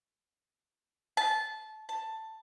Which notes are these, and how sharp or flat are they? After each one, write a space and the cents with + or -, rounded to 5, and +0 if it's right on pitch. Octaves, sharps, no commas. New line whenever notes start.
A5 -20
A5 +10